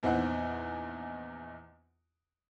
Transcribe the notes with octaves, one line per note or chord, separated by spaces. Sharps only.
A#1 E2 C4 D#4 F#5